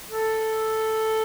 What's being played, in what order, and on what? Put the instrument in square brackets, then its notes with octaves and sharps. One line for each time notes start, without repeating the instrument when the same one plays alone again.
[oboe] A4